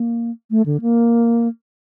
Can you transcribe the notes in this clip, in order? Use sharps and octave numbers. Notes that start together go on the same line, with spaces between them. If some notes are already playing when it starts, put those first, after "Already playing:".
Already playing: A#3
A3
D3
A#3